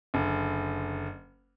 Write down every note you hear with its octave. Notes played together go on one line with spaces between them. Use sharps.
F#1 D3